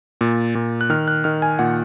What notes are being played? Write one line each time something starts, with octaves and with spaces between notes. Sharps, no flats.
A#2
A#2
F#6
D#3 F6
F#6
D#3 F6
G#5
A#2 F#5